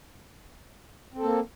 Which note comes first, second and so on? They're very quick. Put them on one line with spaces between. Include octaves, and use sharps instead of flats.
C4 A4 A#3